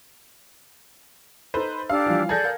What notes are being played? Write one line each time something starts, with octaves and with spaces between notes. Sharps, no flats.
D#4 A4 B4 C5
D4 G4 F5 E6
E3 F3 G3
G#4 A4 D5 A5 G6 G#6 A#6
A#4 F5